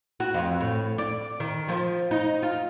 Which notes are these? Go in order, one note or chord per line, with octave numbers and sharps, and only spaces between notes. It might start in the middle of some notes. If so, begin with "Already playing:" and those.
F#4
F2
A2
D5
D#3
F3
D#4
F4